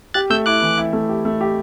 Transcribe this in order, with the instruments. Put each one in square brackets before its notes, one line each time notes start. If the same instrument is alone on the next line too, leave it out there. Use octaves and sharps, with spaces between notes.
[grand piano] G4 [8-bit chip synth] F#6 A6
[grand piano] A3 [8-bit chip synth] E6 G6
[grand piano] E4 [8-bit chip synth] D6 F#6
[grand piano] E3
E4
A3
G4
A3
G4